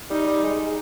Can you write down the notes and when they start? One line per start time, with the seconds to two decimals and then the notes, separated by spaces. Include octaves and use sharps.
0.10 G3 D#4
0.27 G3
0.43 G#3
0.60 G#3